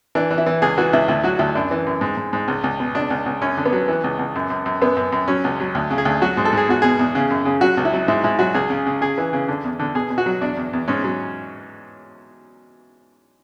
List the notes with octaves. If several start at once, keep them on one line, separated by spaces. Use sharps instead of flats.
E3 D4
E3
E4
E3
C#2 G#4
E3 F#4
C#2 E4
D2 E4
F#3 F#4
D2 E4
F#2 D4
E3
F#2
G#2
G#2
G#2
C#2
C#2
B2
C#2 D4
C#2
C#2
F#2 C#4
D3
B3
F#3
E3
C#2
C#2
F#2
F#2
F#2
F#2 B3
F#2
F#2
F#3 C#4
C#2
F#3
D2
C#3
G#4
D2
F#3 F#4
G#2
A4
G#2 G#4
E2 F#4
B2 G#4
E2
C#3
F#2
C#3
F#3 F#4
C#2
E4
F#3
G#2 E4
G#2 E4
F#3 F#4
C#2 G#4
C#3
C#3
C#3 G#4
E3
C#3
D3
E2
D3
B2 G#4
B2
F#4
F#3
E2 D4
E2
E2
G#2 C#4
F#3